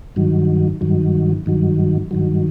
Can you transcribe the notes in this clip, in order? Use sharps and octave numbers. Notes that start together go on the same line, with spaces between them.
G2 D#3 F#3
G2 D#3 F#3
G2 D#3 F#3
G2 D#3 F#3